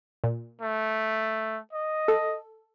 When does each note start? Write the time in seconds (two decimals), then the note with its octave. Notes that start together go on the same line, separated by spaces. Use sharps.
0.24 A#2
0.62 A3
1.73 D#5
2.08 A4